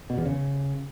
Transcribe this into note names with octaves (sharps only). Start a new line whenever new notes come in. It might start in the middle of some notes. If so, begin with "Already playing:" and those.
B2
E2
C#3